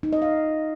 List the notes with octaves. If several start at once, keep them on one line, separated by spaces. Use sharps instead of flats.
D#4
D#5
F5